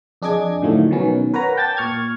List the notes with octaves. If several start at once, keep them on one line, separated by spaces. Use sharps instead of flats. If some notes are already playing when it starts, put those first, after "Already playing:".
F2 D4 G#4 D#5 D6 G#6
A2 D3 D#3 F3 F#3 A3
B2 D#3 F#3 B3 C#4
A#4 B4 C#5 F#5 A#5
G5 A5 D6 A6
A#2 C#6 F6 G#6